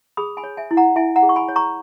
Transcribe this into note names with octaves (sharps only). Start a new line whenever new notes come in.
G#4 B5 D#6
G#5 B5
C#5
E5 G#5
E4
F#5 A#5
E4 E5 G#5
F#5 A#5
G#4
C#6
G#5 B5
C#5
A#5 C#6